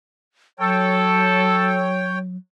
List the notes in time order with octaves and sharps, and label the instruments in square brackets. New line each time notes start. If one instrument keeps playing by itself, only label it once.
[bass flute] F#3 [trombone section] A4 [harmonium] C#5 G5